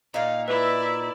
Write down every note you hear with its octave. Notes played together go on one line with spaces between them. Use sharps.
A#2 D#4 F5
E4 B4 D5 E5